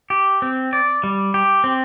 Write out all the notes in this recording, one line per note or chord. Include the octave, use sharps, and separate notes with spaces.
G4
C4
D5
G3
G4
C4